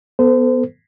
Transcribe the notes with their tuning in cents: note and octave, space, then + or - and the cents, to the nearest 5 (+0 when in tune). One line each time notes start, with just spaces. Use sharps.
B3 +0 A4 +15 C5 -30